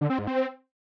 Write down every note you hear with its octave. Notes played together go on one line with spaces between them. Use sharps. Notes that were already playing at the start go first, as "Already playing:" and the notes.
D3
C4
G#2
C4